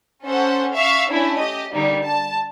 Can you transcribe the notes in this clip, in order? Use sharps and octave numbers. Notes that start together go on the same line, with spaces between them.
C#4 A4 C5 F#5
E5 F5 C#6 E6
A3 C#4 D4 E4
G4 D#5
D3 G3 A#3 D#4
A5